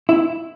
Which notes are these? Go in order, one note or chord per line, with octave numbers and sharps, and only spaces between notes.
E4